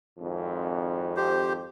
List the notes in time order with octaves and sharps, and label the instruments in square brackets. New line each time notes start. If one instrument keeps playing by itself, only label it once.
[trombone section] G#1 F2
[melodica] G4 C5